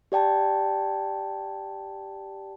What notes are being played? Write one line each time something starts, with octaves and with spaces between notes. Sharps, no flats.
G4 D5 G5 A5